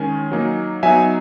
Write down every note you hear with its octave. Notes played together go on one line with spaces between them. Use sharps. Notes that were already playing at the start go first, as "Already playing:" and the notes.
Already playing: D#3 G#3 C#4 G#5
F#3 A#3 D#4
F#3 B3 D#4 E5 G#5